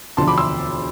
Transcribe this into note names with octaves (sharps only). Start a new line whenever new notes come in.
E1 D2 D3 F3 A5 C6
B5 D6
C6 E6